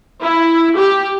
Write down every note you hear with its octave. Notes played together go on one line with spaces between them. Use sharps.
E4
G4